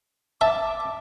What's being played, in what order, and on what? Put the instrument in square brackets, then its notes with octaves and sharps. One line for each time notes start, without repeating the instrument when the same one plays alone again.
[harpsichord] E5 [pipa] A5 [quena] D6